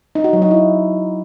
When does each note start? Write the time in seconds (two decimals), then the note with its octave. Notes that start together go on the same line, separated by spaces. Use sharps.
0.15 D#4
0.24 F#4
0.33 F#3
0.42 D#4
0.51 E4